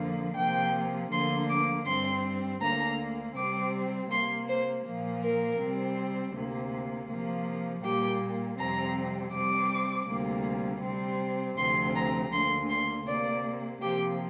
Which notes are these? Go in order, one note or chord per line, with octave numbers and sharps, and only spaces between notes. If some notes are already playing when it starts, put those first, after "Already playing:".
Already playing: F2 D3 F3 A#3
C3 F3 A#3 G5
D2 D3 F3 A#3 C6
D6
G2 G3 C4 C6
D2 D3 A#3 A#5
C3 G3 C4 D6
C3 A#3 C6
C5
A#2 F3 A#3
A#4
C3 G3 C4
D2 C3 A#3
C3 F3 A#3
A#2 G3 A#3 G4
F2 C3 G3 C4 A#5
C3 G3 C4 D6
D2 C3 G3 A#3
C3 G3 C4
D2 C3 F3 C4 C6
A#5
D2 D3 A#3 C6
C6
C3 A#3 D5
C3 F3 A#3 G4